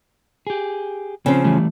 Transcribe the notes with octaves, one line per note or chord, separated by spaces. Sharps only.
G4 G#4
C#3 F3 C4 C5
E3 G3 A3